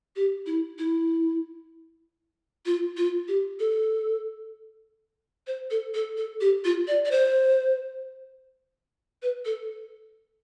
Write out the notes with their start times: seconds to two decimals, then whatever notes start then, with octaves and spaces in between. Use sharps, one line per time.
0.16 G4
0.46 E4
0.78 E4
2.66 F4
2.97 F4
3.28 G4
3.60 A4
5.47 C5
5.71 A4
5.94 A4
6.17 A4
6.41 G4
6.65 F4
6.88 D5
7.05 D5
7.11 C5
9.22 B4
9.45 A4